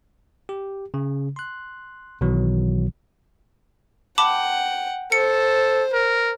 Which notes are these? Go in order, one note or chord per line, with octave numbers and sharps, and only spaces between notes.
G4
C#3
C6 F#6
B1 B2 D#3 E3 F#3
F#5 G5 A5 B5 D6
A4 C5 C#7
A#4